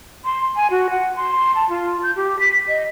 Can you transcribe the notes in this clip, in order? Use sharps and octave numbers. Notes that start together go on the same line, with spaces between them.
C6
G#5
F#4
F#5
C6
A5
F4
G6
G4
B6
D#5